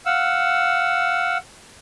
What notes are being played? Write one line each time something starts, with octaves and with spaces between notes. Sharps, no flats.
F5 F#5 E6